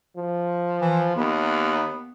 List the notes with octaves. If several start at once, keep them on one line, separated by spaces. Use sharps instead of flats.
F3
E3
D#2 B3